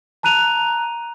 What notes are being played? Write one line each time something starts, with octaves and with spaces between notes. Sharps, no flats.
A5 A#5 F#6 D#7 F7